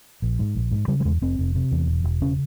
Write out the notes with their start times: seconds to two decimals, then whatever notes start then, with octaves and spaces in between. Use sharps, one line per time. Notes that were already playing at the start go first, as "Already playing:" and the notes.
0.22 A#1
0.39 G#2
0.55 A#1
0.72 G#2
0.88 C#3 G3
1.00 G3
1.05 E2 G#3
1.21 F1 C4
1.39 F1
1.55 C3
1.72 E2
1.88 E1
2.04 E1
2.22 C#3 C#4